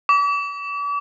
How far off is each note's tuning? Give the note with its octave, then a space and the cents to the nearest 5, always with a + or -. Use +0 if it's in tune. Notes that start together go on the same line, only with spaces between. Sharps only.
D6 -40